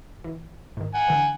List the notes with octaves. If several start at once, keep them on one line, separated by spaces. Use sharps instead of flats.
E3
G#2 D#3
F#5 G#5
D3 E3